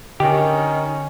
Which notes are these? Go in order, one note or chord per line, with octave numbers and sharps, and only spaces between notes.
D3 D#3 C#4 G4